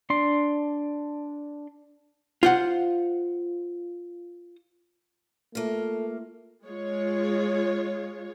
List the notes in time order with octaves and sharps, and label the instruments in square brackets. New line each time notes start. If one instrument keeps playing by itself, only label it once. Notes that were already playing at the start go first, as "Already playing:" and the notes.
[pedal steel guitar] D4 C6
[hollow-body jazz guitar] F4 C5 F#5
[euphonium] A3 [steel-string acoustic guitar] A#3 F4
[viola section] G#3 F4 C#5